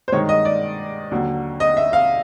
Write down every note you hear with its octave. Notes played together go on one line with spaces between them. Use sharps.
C5
G2 D#3 G#3 C#5
D#5
D5
D#2 D3 F#3
D#5
E5
F5